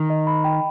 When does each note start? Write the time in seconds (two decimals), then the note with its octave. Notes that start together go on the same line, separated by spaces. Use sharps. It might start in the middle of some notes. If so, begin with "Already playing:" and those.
Already playing: D#3
0.10 D#5
0.27 B5
0.44 G5